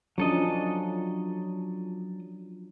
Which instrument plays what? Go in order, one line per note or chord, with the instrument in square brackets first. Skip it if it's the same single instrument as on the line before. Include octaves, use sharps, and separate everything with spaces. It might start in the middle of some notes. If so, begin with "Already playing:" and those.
[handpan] F3 C#4 D4 [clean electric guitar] F#3 A4 D#5